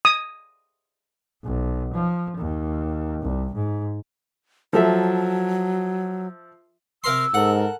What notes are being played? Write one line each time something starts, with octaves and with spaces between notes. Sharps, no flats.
D#6
B1
F3
D#2
C2
G#2
F3 F#3 A4 E5
C3 A#4 C6 E6
G#2 A4 A#4 F#5